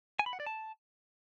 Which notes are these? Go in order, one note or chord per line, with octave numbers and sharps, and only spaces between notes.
G#5
B5
F#5
D5
A5